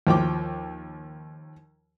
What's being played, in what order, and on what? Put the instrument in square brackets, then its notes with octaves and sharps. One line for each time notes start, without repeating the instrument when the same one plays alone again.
[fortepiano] D#2 F3 G5 D6